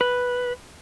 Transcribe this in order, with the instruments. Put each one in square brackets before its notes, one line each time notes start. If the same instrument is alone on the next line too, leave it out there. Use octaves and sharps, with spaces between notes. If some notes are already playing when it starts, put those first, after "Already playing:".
[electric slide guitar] B4